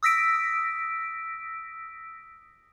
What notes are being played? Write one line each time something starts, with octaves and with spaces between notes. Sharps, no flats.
D#6 E6 A#6 B6 D7